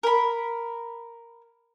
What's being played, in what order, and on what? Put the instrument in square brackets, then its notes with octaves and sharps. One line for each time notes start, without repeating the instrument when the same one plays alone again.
[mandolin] A#4 B5